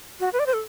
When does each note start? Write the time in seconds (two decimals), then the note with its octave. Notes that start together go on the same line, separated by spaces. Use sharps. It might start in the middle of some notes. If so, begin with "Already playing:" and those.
0.20 F#4
0.33 B4
0.39 D5
0.46 C5
0.53 A4